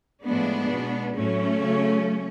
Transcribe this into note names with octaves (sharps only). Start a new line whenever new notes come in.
A2 F3 G#3 B3 D4
B2 G#3
A2 F#3 A3 C#4
C#3 F#3